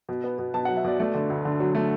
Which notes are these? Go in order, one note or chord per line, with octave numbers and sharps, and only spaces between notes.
B2
B3
B2
B2 A5
F#5
F#3
E5
B2 D5
A3 D5
D3
D2
D3
F#3
A3